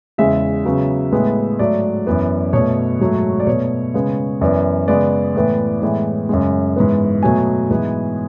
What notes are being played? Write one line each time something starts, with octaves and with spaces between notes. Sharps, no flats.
E2 C#3 G#3 E5
C#3 F#3 B3
A2 G#3 B3
G#2 F#3 A3 D5
F#2 E3 B3
B2 F#3 A3 C#5
G#2 F#3 A3
D5
B2 A3 C#5
C#3 G#3 B3
F#2 E3 B3 D5
C#3 G#3 B3 D5
A2 E3 B3
A2 E3 G#3 B3
F#2 C#3 G#3
G#2 E3 B3
B2 F#3 A3 G#5
G#2 E3 G#3 B3